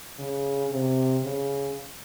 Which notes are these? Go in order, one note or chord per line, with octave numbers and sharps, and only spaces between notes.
C#3
C3
C#3